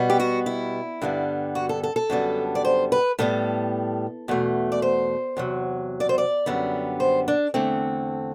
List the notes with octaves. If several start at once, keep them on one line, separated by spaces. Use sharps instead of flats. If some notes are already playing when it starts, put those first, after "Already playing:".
Already playing: B2 G3 B3
G4
F#4
E4
G2 D3 G3 B3
F#4
A4
A4
A4
F#2 D3 G3 B3
D5
C5
B4
A2 G3 B3 A4
E2 B2 A3
D5
C5
E2 C3 F#3
D5
C5
D5
F#2 D3 G3 B3
C5
D4
E2 D3 A3 C4